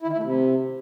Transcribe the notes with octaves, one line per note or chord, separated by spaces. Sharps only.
E4
D#3
E4
A3
C3